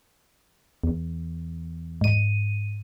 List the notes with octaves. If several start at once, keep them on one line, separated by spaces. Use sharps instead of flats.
E2
G#2 D#7